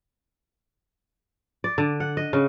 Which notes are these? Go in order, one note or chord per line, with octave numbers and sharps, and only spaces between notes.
D5
D3
F#5
D#5
C#3